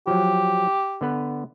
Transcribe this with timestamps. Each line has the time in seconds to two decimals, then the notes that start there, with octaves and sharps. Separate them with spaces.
0.07 F3 F#3 G4
1.01 D3 B3 B4